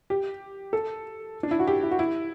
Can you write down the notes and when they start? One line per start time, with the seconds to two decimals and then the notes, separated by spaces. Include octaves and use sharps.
0.10 G4
0.73 A4
1.43 D4
1.51 E4
1.59 F#4
1.67 G4
1.83 E4
1.91 F#4
1.99 E4